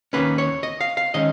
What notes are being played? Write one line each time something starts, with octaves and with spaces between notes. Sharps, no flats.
D#2 D#3 A#3 C#4 B4
C#5
D#5
F5
F5
D#3 G#3 C#4 D#5